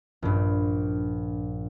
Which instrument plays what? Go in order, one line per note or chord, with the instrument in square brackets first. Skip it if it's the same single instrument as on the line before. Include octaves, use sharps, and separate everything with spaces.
[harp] A#1 G2